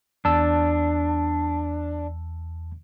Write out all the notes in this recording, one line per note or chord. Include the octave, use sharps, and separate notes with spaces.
E2 D4 A5 E6